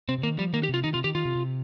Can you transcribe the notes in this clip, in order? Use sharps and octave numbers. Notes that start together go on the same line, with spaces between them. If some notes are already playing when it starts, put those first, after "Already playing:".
C3 C4
C3
D#3 A#3
F3 G3
D#3 A#3
G4
C3 F4
D#3 D#4
C3 F4
D#3 G4
D#3 F4
C3
C3